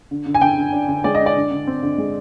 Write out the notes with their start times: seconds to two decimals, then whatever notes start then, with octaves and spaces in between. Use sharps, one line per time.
0.11 D3
0.26 D3
0.34 G#5
0.41 D3 G5
0.57 D3
0.73 D4
0.88 D3
1.04 G#3 D5
1.15 D#5
1.20 D4
1.26 D5
1.36 D3
1.51 D3
1.67 C4
1.83 D3
1.98 G#3